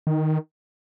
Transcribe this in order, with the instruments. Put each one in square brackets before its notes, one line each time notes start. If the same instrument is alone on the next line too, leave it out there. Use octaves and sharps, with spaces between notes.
[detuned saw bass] D#3